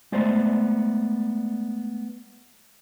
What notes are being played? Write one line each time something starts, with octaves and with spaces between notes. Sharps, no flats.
G#3 A3 B3 C5 D5